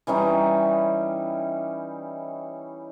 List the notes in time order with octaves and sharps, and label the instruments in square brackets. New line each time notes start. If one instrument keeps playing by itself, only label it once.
[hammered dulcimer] E3 G3 C#4 D#4